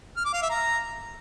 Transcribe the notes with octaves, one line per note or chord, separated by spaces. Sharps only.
F6
D6
F5
E5
A#5